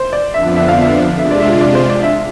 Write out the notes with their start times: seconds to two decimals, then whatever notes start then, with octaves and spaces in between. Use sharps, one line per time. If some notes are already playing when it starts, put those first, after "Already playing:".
Already playing: C5
0.13 D5
0.34 F2 D3 F3 B3 D4 E5
0.56 E5
0.68 F5
0.81 E5
1.19 C3 G#3 D4 F4 E5
1.31 D5
1.40 E5
1.61 D5
1.75 C5
1.89 D5
2.03 E5